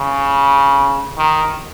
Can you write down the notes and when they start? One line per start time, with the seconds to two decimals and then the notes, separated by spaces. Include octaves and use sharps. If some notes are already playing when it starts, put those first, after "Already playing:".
Already playing: C#3
1.18 D#3